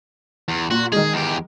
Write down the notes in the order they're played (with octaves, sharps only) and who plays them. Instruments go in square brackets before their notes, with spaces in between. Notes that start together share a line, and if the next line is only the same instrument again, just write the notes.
[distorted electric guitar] E2
[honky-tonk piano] A#2 [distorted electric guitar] F#4
[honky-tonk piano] D#3 G#3 [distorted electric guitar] G#4
[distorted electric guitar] E2 G4